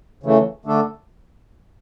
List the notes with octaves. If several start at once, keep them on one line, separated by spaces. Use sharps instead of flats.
C#3 E3 A3
D3 A3 D4 A4